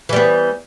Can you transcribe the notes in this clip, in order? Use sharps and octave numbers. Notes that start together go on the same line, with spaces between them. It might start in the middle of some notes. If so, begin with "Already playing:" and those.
E3 G3 B3